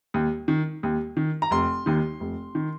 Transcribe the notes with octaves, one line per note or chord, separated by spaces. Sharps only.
D#2
D#3
D#2
D#3
A#5
F1 C6
D#2 D#3
F1
D#3